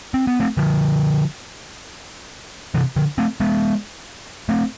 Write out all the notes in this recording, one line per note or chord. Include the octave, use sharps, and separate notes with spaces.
C4
B3
A3 C4
D3 F3
C3 E3
D3 F3
A3 C4
G#3 B3
A3 C4